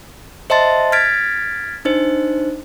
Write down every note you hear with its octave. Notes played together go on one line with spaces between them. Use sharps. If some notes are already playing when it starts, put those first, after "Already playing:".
C5 D#5 E5 A5 C6 A6
F6 G#6 A6 B6 D7
D4 D#4 C5